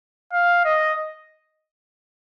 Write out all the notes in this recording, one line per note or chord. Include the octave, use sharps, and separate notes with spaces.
F5
D#5